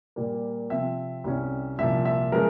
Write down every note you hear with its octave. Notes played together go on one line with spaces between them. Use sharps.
A#2 G3 A#3
C3 F3 C4 E5
C2 C3 G3 C#4
C2 A#2 F3 E5
E5
F3 G#3 C#4 A#4